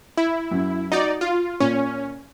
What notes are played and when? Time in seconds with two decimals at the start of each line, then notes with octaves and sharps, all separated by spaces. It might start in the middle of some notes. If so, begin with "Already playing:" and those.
0.17 E4
0.51 F#2
0.92 D#4 F#4 D5
1.21 F4
1.60 A#2 C#4